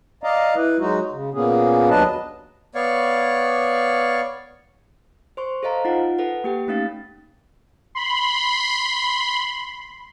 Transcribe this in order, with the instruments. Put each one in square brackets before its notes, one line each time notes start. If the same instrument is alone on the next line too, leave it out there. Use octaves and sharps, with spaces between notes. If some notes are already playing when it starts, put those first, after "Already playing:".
[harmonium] D5 D#5 F5 A#5
E4 B4
F#3 G#3 D#4 F#4
C#3
A#2 A#3 B3 C#4 G#4
D#2 F#3 D4 B4 D#5 A5
[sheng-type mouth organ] B3 C#5 D5 F5 C#6
[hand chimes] C5 C6 C#6
A4 C5 D#5 F5 A#5
D#4 F4 F#5
A4 B4 F#5
A#3 G4 G5
A3 C#4 D#4 F5 A6
[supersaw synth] B5 C6